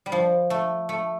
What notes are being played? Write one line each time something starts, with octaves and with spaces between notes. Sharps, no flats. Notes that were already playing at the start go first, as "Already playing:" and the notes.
G3
F3
A3
A3